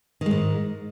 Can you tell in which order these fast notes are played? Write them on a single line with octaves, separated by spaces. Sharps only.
D#3 G#3 G#2